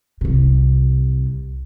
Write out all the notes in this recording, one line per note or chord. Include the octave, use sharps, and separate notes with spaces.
C2 C3